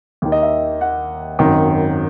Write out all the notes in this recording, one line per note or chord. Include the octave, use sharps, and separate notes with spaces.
D#2 D#3
D#5
E5
F#5
G#1 F#2 D#3